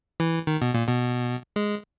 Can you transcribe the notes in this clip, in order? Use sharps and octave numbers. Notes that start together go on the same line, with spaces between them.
E3
D#3
B2
A#2
B2
G#3